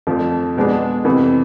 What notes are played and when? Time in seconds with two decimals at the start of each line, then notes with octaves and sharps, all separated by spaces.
0.07 F2 D3 F3 A3
0.56 B2 G#3 B3 D4 G#4
1.05 F2 C3 E3